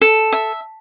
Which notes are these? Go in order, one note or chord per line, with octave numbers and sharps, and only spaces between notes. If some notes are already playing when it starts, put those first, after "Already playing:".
A4
E5